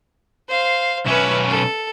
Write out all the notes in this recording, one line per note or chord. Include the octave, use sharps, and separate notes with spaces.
C5 F5
B1 C#4 B4 E5
A4